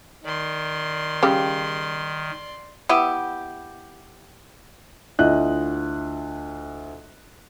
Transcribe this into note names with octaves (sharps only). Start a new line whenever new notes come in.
D#3 D5 C6
C#3 G3 G4
B3 E4 G4
D2 E4 F4 D#5 E5 F#6